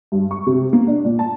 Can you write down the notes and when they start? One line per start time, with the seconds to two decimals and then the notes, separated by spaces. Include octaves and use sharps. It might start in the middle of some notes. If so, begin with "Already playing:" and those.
0.12 G2
0.31 C#6
0.47 C3
0.73 A#3
0.87 D4
1.05 A#2
1.19 A5